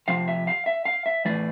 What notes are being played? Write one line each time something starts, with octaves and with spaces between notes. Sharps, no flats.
C3 F3 F5
E5
F5
E5
F5
E5
A2 E3 D5